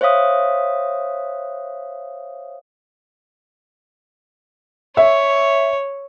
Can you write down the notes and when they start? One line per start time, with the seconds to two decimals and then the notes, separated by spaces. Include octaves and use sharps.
0.01 C5 C#5 E5 F5 D#6
4.97 C#5 E5